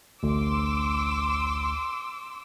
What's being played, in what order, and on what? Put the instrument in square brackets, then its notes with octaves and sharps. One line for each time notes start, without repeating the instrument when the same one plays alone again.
[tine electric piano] A1 D2 [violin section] C6 D6 E6